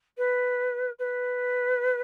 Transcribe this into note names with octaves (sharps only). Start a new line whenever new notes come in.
B4
B4